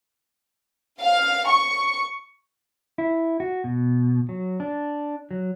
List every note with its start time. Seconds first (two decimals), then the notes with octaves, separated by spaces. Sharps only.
1.01 F5
1.48 C#6
2.98 E4
3.40 F#4
3.64 B2
4.29 F#3
4.60 D4
5.31 F#3